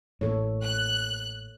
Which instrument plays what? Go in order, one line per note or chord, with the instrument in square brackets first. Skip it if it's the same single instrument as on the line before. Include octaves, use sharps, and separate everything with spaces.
[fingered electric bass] A1 A2 [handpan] A#3 A4 C#5
[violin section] F#6